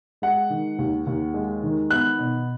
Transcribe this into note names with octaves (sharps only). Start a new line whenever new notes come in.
G#3 F#5
D#3
D#2
D#2
G#3
D#3
B3 F#6
B2